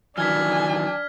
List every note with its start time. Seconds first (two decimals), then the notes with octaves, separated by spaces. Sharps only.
0.18 D#3 E3 F#3 D4 G#5 F6 G#6 B6